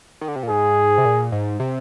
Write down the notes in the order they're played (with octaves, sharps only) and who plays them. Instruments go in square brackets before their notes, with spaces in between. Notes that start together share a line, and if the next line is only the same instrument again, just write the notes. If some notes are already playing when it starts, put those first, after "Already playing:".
[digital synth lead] D#3
D3
C3
A#2
[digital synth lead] G#2 [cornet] G#4
[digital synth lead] C3
A#2
G#2
C3